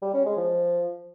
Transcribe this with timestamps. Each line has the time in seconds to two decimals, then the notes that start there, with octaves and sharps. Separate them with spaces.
0.02 G3
0.14 C#4
0.25 G#3
0.37 F3